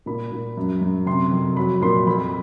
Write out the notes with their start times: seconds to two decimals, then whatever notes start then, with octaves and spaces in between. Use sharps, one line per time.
0.06 A#2 B5
0.32 A#2
0.57 F#2
0.81 F#2
1.06 C3 C6
1.31 F2
1.56 F#3 B5
1.81 A#2 C6
2.07 F2 B5